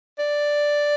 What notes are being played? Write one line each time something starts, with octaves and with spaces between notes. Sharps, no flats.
D5